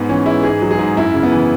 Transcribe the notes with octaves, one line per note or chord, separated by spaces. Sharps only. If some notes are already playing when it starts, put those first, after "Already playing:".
Already playing: G#2 B3
E3 C#4
G#3 E4
G#2 G#4
F#3
G#4
G#2
F#2 E4
C#3
B3
E3